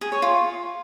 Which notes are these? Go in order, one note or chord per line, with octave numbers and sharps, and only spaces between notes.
G#4
C#5
F4